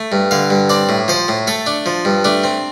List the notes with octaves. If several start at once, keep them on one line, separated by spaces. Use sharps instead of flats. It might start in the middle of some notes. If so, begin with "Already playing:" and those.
Already playing: A3
G2
D3 F5
G2
C4 D5
A2
F3 C5
A2
A3 A4
D4
F3
G2
A3 D4
C4